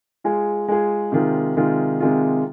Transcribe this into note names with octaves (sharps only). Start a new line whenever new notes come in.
G#3 F4 G#4
G#3 F4 G#4
C3 D#3 G#3 F4
C3 D#3 G#3 F4
C3 D#3 G#3 F4